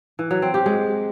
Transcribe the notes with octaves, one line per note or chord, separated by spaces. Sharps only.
E3
F#3
C4
G4
G#3